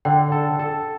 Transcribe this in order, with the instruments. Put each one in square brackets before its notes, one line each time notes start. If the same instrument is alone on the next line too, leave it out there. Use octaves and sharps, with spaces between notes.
[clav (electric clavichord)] D3 [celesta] G5
[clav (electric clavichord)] A4
A4